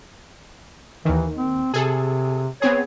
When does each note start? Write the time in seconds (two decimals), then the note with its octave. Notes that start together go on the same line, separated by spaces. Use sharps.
1.05 D#2 D#3 E3
1.38 C4
1.74 C3 G#4 A4
2.62 B3 C4 G#4 C#5